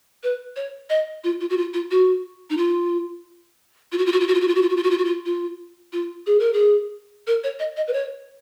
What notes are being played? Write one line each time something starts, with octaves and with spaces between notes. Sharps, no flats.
B4
C#5
D#5
F4
F4
F#4
F4
F4
F#4
D#4
F4
F4
F#4
F4
F#4
F4
F#4
F4
F#4
F4
F#4
F4
F#4
F4
F#4
F4
F#4
F4
F4
F4
G#4
A#4
G#4
A#4
C#5
D#5
D#5
B4
C#5